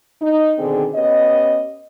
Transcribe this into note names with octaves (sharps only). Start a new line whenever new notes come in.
D#4
B2 D3 D#3 C4 G#4
B3 C#4 G4 D#5